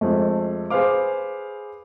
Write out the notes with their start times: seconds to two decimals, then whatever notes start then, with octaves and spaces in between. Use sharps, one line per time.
0.01 F2 G#3 A3
0.70 G#4 B4 C5 F5 D6